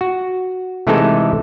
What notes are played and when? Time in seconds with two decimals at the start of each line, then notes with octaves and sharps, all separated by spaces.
0.01 F#4
0.87 C3 E3 G#3 A3 D#4 A4